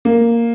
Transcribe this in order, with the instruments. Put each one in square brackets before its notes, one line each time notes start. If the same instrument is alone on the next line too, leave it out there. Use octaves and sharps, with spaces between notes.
[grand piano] A#3